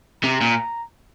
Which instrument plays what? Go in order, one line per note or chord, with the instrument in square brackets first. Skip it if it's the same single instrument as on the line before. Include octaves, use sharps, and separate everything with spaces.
[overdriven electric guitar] C3 [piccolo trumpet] A#5
[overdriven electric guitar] A#2